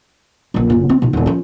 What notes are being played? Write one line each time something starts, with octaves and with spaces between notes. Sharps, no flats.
D#1 A#1
F#1 A#2
C4
B2 D#4
D#1 D#3
F3 C#4